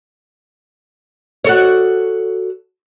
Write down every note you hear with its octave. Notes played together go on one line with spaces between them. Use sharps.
F#4 A4 C#5